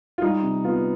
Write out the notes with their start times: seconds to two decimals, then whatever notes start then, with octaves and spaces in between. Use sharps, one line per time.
0.18 F4
0.22 G3 D#4
0.43 C3
0.64 B3 F4